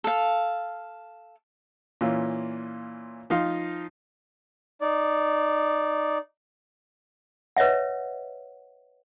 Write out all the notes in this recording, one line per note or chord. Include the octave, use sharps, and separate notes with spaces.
A4 F5
A#2 E3 C#4 F4
F3 D#4 F5 C6
D#4 D5
B4 C#5 D#5 E5 F#5